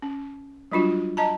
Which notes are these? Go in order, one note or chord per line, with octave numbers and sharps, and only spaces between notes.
C#4
F#3 G3 D4 F4 F#4
D#5 A5 A#5